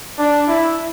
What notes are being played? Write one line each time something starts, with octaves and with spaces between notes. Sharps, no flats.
D4
E4